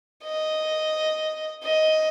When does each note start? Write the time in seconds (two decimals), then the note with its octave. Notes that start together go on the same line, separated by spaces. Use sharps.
0.24 D#5
1.64 D#5